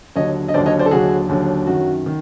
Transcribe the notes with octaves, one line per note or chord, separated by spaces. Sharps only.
D#2 D3 F#3 C#5 D#5
D#5
D#2 D3 F#3 C5 D5
C#5 D#5
C5 D5
A4
D#2 D3 F#3 F#4 G#4
D#2 D3 F#3
F#2 D#3 F#3 F#4
D#3